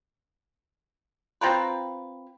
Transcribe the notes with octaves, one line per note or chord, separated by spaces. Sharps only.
C4 F4 A#4 B4